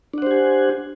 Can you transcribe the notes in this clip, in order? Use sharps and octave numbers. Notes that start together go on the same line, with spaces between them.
D4 G4 C5 F#5 G#5